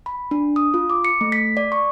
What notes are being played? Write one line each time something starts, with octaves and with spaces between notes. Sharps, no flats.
B5
D4
D#6
F4
D6
C#7
A3
B6
D5
C#6